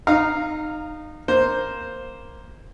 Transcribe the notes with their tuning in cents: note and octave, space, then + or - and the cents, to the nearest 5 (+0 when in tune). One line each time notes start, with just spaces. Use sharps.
D#4 -20 F5 +0 A#5 +0
A#3 +0 C5 +0